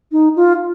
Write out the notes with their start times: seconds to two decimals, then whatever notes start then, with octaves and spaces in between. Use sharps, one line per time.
0.12 D#4
0.36 F4